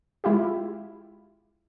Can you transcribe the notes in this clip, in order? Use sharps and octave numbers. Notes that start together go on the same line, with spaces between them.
G#3 E4 F4 G4